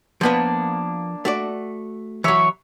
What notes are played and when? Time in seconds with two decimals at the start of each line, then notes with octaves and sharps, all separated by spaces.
0.21 F3 A#3 B3 D4 B4
1.25 A3 F#4 D5
2.24 E3 F#3 C#5 E5 B5